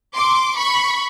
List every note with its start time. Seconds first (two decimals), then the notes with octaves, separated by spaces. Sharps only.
0.15 C6 D6
0.56 B5 C#6